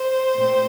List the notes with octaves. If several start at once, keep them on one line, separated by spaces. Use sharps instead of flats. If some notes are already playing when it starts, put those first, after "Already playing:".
Already playing: C5
A#2 A3 C4